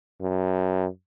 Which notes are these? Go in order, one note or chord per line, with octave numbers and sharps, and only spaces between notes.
F#2